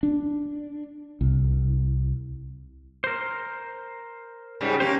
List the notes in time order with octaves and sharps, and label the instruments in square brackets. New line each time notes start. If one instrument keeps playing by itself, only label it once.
[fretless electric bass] D4
C2
[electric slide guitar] A#4 C5
[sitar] G#2 C#3 G3
[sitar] A#3 G4 [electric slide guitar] C#4 C5